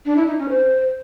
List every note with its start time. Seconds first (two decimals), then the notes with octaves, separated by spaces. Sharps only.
0.05 D4
0.16 E4
0.27 D#4
0.38 C#4
0.49 C5